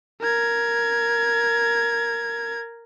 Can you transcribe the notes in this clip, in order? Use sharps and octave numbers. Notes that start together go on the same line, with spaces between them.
A#4 G#6